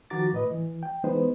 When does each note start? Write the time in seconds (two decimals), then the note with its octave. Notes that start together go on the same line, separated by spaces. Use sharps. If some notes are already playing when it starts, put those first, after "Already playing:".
0.10 D#3 F3 F#4 A#5 D6 A6
0.33 A2 B4 D#5
0.51 E3
0.83 G5
1.04 E3 G#3 B3 D#4 B4 C5